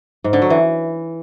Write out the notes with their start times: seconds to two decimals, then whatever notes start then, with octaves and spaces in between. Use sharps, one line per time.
0.24 G#2
0.33 D3
0.42 F#3
0.50 E3